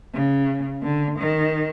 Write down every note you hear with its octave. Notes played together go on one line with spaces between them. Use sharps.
C#3
D3
D#3